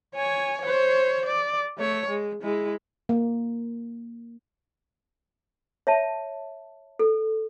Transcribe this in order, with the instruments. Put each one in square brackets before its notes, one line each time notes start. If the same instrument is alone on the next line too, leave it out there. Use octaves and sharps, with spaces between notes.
[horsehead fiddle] C#5 G#5
C5 C#5
D5
A3 C#5
G#3
G#3 E4
[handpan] A#3
[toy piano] C#5 E5 A5
A4